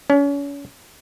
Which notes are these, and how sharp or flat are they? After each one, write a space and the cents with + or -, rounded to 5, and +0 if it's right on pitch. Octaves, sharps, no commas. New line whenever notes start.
C#4 +35